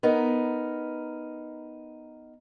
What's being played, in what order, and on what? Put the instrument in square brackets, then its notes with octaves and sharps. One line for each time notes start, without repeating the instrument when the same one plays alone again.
[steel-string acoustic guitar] B3 D#4 A#4